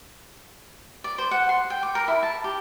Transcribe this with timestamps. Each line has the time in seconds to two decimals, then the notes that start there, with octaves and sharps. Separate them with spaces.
1.04 D5
1.18 C5
1.31 F#5
1.49 C6
1.70 G5
1.83 D6
1.95 A#4
2.08 E4
2.23 A5
2.44 G4